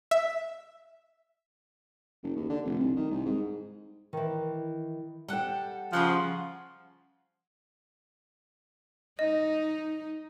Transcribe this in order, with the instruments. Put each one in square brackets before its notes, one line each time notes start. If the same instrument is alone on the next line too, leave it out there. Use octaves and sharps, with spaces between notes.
[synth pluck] E5
[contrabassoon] F#1
D#2
D3
F1
C2
D#3
C2
G#2
[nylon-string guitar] D#3 E3
[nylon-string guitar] G3 G5 [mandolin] A4 F#5
[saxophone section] C#3 F3 [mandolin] G#4 C5 F#5
[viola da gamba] D#4 [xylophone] D#5